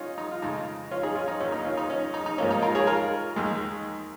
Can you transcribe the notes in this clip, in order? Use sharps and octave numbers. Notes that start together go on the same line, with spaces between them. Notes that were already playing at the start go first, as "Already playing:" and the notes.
Already playing: C#4 D#4 F4
D#4
F4
F2 C#3 G#3 D#4
C#4 F4
D#4 G#4
C#4 F4
D#4
D#2 D#3 A#3 C#4
D#4
C#4 F4
D#4
C#4
D#4
D#4
G#2 F3 A#3 C#4
D#4
F4 A#4
G#4 C#5
F4 A#4
D#2 D#3 G#3